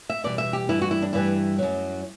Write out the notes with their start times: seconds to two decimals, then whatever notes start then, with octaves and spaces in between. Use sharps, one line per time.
0.09 E5
0.24 E2 B2 G3 D5
0.38 E5
0.53 G4
0.69 G2 E3 G3 E4
0.82 F#4
0.91 E4
1.02 D4
1.13 G2 E3 G3 E4
1.58 F#2 F#3